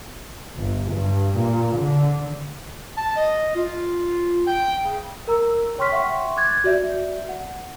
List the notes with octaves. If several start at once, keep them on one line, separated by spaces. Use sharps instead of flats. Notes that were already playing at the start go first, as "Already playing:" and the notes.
G1
G2
A#2
D3
A5
D#5
F4
G5
C#3
A#4 A#5 E6
C#5 G5 C6 C#6 F6 B6
E5 F#5 G5 C6 C#6
D6 F#6 G#6 A6
F#4 D5 E5 G6
F#5